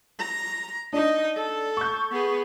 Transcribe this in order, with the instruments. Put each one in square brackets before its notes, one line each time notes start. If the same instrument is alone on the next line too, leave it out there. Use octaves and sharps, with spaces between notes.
[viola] A#5
[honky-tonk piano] D4 [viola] D#4 D#5
[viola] A4
[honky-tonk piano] C#6 G6
[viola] B3 G#4